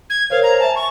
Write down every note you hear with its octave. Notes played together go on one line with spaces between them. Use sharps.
G#6
A#4 C5 C#5 F5
A#5
E5 G#5 A5
C#6